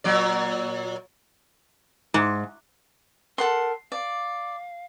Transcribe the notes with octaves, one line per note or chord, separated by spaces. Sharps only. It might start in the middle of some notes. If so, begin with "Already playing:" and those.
A#2 F#3 D5
G#2
A4 A#4 F#5 C6
D5 F5